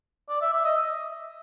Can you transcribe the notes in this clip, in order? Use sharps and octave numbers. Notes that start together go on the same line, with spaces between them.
D5
E5
E5
D#5